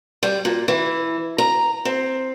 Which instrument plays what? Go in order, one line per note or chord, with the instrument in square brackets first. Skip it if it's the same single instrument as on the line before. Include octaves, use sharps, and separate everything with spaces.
[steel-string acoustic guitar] G3
A#2
E3
A#5
C4